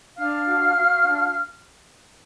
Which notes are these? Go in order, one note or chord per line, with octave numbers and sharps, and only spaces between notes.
D4 F5 F6
F#4
F#4
D4